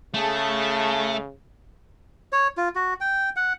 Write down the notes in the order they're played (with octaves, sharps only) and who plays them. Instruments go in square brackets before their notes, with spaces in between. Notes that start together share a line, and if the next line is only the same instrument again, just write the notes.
[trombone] C#3 [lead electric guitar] A3 [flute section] G#4 A5
[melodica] C#5
F4
F#4
G5
F#5